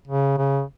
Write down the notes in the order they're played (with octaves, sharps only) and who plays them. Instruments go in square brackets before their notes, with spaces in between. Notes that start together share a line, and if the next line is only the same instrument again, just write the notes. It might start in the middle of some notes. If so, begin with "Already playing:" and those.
[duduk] C#3
C#3